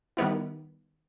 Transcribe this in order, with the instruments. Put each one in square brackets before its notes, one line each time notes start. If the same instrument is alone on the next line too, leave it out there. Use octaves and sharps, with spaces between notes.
[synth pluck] D#3 G3 B3 E4